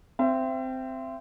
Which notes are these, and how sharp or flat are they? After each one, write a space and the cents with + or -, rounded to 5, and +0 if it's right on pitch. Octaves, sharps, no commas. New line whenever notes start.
C4 -10 E5 +35